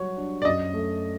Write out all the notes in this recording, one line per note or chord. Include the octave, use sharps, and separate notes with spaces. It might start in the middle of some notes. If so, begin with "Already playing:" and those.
Already playing: F#3 G3 F#4 C#5
D4
D5
F#2 D#5
A3